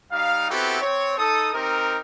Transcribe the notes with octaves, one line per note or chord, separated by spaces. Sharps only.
G3 D#4 G4 F5
B3 C4 E4 F#4 G4 A4
C4 C#5
D#4 A4 D#6
C4 D#4 G4 A#4